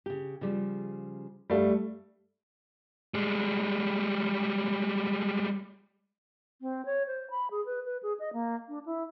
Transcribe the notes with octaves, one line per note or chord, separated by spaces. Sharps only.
C#3 G4
C#3 F3 G3
G2 G3 A3 F5
G3 G#3
C4
C#5
C5
B5
G#4
B4
B4
G#4
D#5
A#3
D4
E4